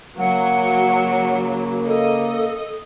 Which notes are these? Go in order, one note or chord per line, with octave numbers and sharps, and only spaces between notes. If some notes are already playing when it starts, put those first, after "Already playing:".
C#3 F#3 A#3 F#5
A4 D#5